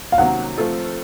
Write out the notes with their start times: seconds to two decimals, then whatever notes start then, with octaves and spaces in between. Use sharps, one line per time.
0.12 F5
0.18 C3 D#3 F#3 A#3 C#4 F#5
0.57 F3 A3 C4 F4 A4